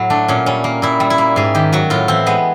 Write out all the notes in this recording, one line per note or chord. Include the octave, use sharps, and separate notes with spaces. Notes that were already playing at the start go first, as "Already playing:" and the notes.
Already playing: A2 F#3
A3 D4
A#2 C#4
G3 C#4
A#3
A#2 E4
G3
E4
A#3
G#2 G#4
D#3 G4
F#3 F#4
A2 F4
E3 C4
G#3 B3